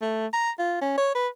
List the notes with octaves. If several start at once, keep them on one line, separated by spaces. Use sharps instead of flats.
A3
A#5
F4
C#4
C#5
B4